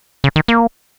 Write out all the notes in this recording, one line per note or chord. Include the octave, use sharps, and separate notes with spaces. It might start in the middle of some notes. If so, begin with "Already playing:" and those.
C#3
D#3
A#3